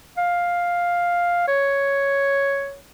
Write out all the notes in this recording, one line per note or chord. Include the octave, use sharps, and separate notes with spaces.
F5
C#5